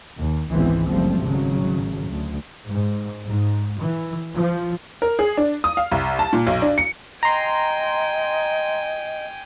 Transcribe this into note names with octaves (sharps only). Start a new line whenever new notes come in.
D#2
G#1 C#2 E3 G#3 B3 C4
F#1 F3 G3 A3 C4
G#1 C#3 F#3
D2
G#2
G#2
E3
F3
A#4
G#4
D4
D#6
F5
C2
A5
A#2
B1
D4
C#7
D#5 G5 G#5 A#5 C6